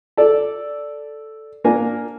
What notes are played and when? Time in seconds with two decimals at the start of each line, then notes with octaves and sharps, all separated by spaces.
0.17 A4 D5
1.64 A#3 D4 A#4 G#5